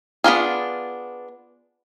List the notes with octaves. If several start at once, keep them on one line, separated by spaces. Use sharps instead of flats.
B3 D4 F4 G#4